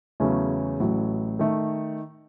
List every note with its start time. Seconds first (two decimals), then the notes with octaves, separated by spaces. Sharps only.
0.20 E2 C#3 F#3 A3 C#4
0.80 A1 A2 F#3
1.39 D#3 A3